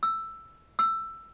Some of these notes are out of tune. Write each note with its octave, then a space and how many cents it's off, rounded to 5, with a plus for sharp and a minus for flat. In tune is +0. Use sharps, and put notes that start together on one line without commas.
E6 +10
E6 +15